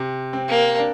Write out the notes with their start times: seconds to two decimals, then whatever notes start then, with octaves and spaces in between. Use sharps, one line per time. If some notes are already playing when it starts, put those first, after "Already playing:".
Already playing: C3
0.33 C4
0.49 A#3
0.78 D4